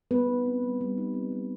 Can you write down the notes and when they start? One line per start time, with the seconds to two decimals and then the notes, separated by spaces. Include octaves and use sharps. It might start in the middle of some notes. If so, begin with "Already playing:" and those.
0.11 G3 B3 B4
0.28 D#4
0.45 C4
0.63 G3
0.81 G3
0.97 D#4
1.14 C4
1.32 G3